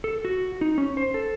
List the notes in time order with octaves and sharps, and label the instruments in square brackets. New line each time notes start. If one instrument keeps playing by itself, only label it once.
[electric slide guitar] A4
F#4
D#4
C#4
C5
A4